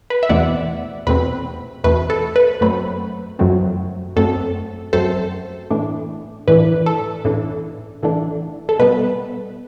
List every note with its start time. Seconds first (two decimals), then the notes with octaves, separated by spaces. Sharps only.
0.10 B4
0.23 E5
0.29 E2 B2 A3 C4 D5 F#5
1.07 E2 B2 A3 C4 B4
1.84 E2 B2 A3 C4 B4
2.10 A4
2.36 B4
2.61 F#2 F#3 A3 C4 B4
3.39 F#2 F#3 A3 C4
4.16 F#2 F#3 A3 C4 A4
4.93 F#2 F#3 A3 C4 A4 C5
5.70 A2 E3 A3 D4
6.48 A2 E3 A3 D4 B4
6.86 A4
7.25 A2 E3 A3 D4
8.03 A2 E3 A3 D4
8.69 A4
8.79 B2 G3 B3 B4